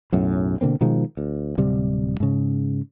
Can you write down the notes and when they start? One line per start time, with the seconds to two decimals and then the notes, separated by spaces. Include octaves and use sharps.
0.12 B1 F#2 A2
0.61 B2 D3 A#3 C4
0.81 B2 D#3 F3 G#3
1.17 D2
1.58 D1 C3 G3
2.20 G#2 C#3